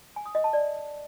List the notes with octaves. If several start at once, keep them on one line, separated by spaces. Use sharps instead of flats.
G#5
D#6
D#5
A5
D5